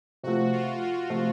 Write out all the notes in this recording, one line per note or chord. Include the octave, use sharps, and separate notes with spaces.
C3 F3 A3 F#4
F4
F4
C3 F3 A3